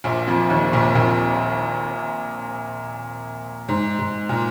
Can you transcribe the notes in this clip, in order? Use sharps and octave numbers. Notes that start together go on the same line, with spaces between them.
A#1 A#2
F2 F3
D#2 D#3
A#1 A#2
A#1 A#2
G#2
G#2
A#2